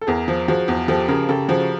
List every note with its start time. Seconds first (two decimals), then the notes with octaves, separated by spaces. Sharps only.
0.01 A4
0.07 E2 G#4 A#4
0.28 F3
0.48 F3 F#4 G#4
0.68 E2
0.88 F3 G4 A4
1.08 C#3 G#4 A#4
1.28 C#3 G4 A4
1.48 F3 F#4 G#4